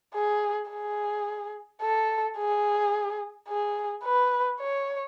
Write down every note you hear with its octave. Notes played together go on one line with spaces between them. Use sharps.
G#4
G#4
A4
G#4
G#4
B4
C#5